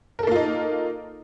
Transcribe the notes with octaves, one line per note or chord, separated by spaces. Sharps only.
A#3 D#4 F4 A4 A#4